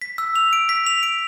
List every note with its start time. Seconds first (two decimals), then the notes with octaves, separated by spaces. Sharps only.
0.02 B6
0.18 E6
0.36 F7
0.53 D7
0.69 B6
0.87 F7
1.03 D7